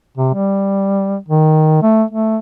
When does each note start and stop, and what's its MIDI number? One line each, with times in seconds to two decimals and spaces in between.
0.17 0.31 48
0.34 1.17 55
1.28 1.80 51
1.82 2.03 57
2.11 2.38 57